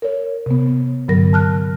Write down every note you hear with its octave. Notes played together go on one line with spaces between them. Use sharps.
A#4 C#5
C3 B3
G2 D3 F#3 A#4 A#6
A5 F6 F#6